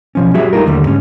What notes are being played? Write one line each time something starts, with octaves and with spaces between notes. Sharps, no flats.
B2 F3 C#4
G3 F#4 G#4 E5
G3 A3 D#4 F4 A#4
D#2 D3 G3 A3
G#2 C#4